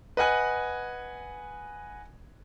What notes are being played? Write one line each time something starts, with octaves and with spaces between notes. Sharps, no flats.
B4 D#5 F#5 G#5 F#6